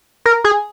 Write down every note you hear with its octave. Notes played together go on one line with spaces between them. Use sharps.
A#4
G#4